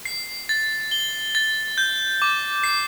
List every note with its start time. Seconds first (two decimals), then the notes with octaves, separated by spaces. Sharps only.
0.05 C7
0.49 A6
0.91 G7
1.35 A6
1.78 G6
2.22 D6
2.64 C7